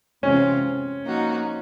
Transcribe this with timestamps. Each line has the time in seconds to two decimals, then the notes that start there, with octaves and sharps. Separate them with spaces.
0.22 C3 E3 G#3 C4 C#4 F4
1.05 F3 A#3 D#4 F#4